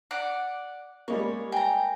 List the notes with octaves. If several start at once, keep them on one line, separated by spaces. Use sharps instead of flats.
D5 F#5
G3 G#3 A#3 C#5
G5 G#5 A#5